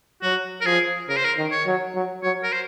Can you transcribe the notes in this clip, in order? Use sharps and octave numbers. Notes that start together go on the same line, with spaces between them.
F#3 F#4
A#4
F3 G#4
C#3 A#4
C5
A#4
D#3
C#5
F#3
F#3
F#3 C#5
A#4
C5